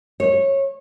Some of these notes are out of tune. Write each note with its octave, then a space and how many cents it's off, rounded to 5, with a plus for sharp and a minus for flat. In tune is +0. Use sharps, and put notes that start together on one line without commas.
C#5 -20